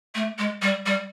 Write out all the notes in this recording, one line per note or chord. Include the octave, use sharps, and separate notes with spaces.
A3
G#3
G3
G3